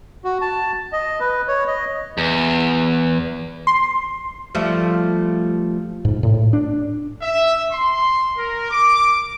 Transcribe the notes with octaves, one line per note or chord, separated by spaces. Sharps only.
F#4
A5
D#5
B4
C#5
D#5
E2
C6
F3 G3 A3
G#2
A2
D4
E5
C6
A#4
D6